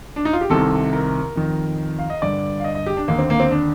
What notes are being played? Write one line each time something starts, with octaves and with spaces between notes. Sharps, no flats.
D4
D#4
F4
G4
C2 C3 D#3 A4
A#4
F2 D#3
F5
D#5
G2 D3 D5
F5
D#5
D#5
G4
D4
D#2 D3 A#3
C4
A#3
C4
D4